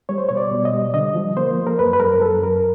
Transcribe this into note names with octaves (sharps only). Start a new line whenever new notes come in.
G3 C#5
C5
B2 C#5
D5
B2
D#5
G3
D3 D#5
F3
A#3 C5
A#3
A#4
F#2 B4
B4
F#2 A#4
F#2 A4
F#2 A#4